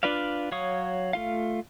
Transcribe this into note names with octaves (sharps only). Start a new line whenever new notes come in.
D4 F4 B4 D5 F5
F#3 C#5 F5 C#6 D#6
A3 F4 F5